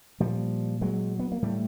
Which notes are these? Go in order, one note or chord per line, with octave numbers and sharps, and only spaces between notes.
A#2 F3 G3
F#3 G#3
B3
A#3
A2 G3 A3